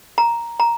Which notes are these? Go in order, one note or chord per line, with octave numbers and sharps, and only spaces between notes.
A#5
A#5